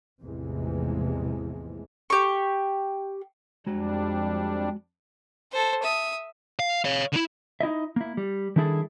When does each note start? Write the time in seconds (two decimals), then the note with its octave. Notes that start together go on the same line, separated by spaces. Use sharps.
0.22 A1 E2 C3 E3 F3 G#3
2.10 G4 C#6
3.66 F2 G3 G#3 D4 F#4
5.52 A4 C5
5.82 E5 D#6
6.59 F5
6.85 C#5 F5
7.13 D3 E4
7.61 D#4 E4 D#5 E5
7.96 A#3 E4
8.17 G3
8.56 D#3 G3 D4 E4 G#4 A4